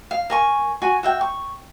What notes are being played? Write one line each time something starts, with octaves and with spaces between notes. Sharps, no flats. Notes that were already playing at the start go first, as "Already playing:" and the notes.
F5
A#4 G#5 C#6
F#4 G#5 C#6
F#4 E5 G5
C#6